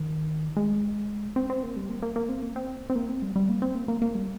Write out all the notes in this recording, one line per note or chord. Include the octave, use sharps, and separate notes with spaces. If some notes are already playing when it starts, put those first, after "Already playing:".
Already playing: D#3
G#3
C4
C4
A#3
G3
A#3
A#3
A#3
C4
A#3
C4
C4
A#3
C4
G3
G3
A#3
C4
A#3
A#3
A#3
G3